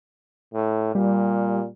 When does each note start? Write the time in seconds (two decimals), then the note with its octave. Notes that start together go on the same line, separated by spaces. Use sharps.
0.54 A2
0.95 A#2 G3